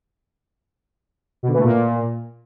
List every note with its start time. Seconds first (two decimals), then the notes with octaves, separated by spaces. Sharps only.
1.43 B2
1.48 D3
1.54 E3
1.59 A3
1.64 A#2